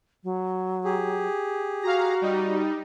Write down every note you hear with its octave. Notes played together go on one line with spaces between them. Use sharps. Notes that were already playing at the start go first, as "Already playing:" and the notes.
F#3
G4 G#4
F#4 F5 A#5
G3 D#4